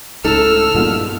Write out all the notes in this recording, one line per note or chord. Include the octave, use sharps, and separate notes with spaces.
C#2 A2 D#4 A4 E6 F6
G2 A#2 F3 G#3 B3 E4